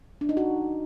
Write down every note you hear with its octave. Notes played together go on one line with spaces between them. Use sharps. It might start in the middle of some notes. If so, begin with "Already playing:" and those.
D4
D#4
F#4